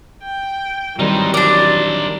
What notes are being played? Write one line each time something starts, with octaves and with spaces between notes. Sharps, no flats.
G5
D#3 E3 F#3 G3 C4 D#4 C5
D4 A#4 C5 D5